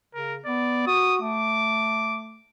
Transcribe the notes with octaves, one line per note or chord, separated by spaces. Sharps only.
C#3 A#4
B3 D5
F#4 D#6
A3 D6